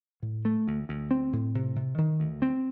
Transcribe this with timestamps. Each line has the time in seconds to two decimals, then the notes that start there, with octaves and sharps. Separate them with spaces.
0.23 A2
0.45 A3
0.68 D2
0.89 D2
1.11 C4
1.33 A2
1.55 C3
1.76 C3
1.98 D#3
2.20 D2
2.42 C4